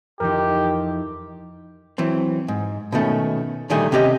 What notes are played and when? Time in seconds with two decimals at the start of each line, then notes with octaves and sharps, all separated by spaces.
0.20 F2 E3 D#4 G4 A#4
1.98 E3 F#3 C4
2.48 G#2
2.92 B2 D#3 A3 C#4
3.70 A#2 D3 D#3 G3 A3 G#4
3.92 C3 C#4 G4 D5 D#5